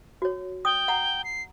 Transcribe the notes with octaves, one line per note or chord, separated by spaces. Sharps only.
F#4 C#5
G5 D#6
F#5 A#5
C7